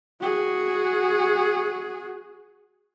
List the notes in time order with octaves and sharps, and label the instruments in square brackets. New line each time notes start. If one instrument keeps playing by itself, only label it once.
[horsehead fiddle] F#4 G#4